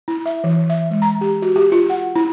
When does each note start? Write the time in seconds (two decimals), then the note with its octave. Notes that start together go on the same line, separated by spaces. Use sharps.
0.08 E4
0.26 E5
0.44 E3
0.70 E5
0.91 G#3
1.02 A#5
1.21 G4
1.42 F#4
1.56 G4
1.72 F4
1.90 F#5
2.16 E4